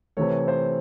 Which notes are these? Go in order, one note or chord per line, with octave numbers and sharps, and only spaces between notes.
C3 E3 A3 C#5
C5